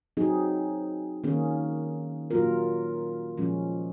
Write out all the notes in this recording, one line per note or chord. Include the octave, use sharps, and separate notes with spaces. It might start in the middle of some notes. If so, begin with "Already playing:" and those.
F#3 C4 D#4 G#4
D#3 A#3 C#4 G#4
A#2 F#3 A#3 F4 A#4
A#2 F3 G#3 C#4